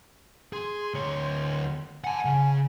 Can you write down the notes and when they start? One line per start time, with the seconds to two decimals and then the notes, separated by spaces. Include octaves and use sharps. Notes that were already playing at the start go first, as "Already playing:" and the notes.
0.53 G#4 C6
0.94 D2 C#5
2.04 F#5 G#5 A5
2.25 C#3